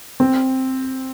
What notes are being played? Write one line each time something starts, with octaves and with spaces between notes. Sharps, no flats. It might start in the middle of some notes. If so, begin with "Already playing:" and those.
C4